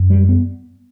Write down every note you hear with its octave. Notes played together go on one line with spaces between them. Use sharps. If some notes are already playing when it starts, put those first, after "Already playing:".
Already playing: F#2
G3
B3